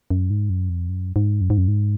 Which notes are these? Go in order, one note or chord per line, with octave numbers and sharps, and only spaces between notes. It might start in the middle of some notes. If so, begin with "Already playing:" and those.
F#2
G#2
F#2
F2
F#2
G#2
F#2
G#2
F#2
G#2